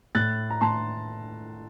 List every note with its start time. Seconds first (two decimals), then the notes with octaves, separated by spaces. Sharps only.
0.15 A2 F#6 A6
0.50 A#5
0.61 A2 A5 C6